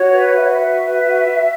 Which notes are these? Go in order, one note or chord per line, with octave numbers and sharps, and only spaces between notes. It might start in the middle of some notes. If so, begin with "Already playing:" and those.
Already playing: F#4 C#5
B4
F#4 E5
C#5
E5
B4
B4
F#4
F#4